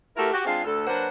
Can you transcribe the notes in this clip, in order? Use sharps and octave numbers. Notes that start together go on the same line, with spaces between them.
A3 E4 F#4 G4 A#4
F#4 G4
G#3 C4 D4 F4 G#4 F5
D2 A4
F#3 A#3 D4 B4 C5 F#5